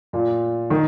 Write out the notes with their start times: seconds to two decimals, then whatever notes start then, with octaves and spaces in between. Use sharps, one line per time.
0.13 A#2
0.70 D#3